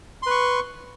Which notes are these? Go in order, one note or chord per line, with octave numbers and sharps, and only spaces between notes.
B4 C6 C#6